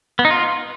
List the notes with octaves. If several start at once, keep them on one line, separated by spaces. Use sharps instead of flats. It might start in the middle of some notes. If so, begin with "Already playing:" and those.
B3
D#4
F4